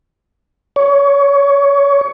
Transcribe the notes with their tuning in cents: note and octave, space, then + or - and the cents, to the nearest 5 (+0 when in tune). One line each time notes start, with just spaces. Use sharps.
C#5 +25